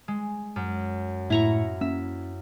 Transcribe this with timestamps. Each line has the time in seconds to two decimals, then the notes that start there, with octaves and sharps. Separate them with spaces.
0.08 G#3
0.56 F#2
1.30 A2 E4 A#5 C#6
1.81 A#3 C#4 E5